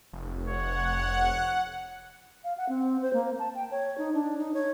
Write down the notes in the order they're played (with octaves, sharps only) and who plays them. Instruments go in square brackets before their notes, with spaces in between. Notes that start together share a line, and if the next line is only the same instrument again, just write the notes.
[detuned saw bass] F1
[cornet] C#5 [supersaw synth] F#5
[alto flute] F5
F#5
C4
C5
A#3
A5
G5
C#5
D#4
D4
D#4
C#5